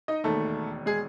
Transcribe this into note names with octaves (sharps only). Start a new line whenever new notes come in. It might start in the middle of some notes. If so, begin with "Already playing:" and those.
D#4 D#5
E1 D#2 D#3 A3 A4
G#3 G#4